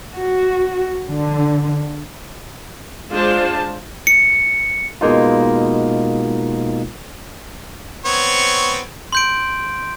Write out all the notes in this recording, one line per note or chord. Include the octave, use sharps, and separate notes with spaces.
F#4
D3
G#3 D4 F4 C5 A5
C#7
B2 G#3 A#3 D#4 F4
B3 C4 C#5
C6 G6 D7